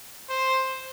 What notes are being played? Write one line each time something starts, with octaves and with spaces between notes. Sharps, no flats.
C5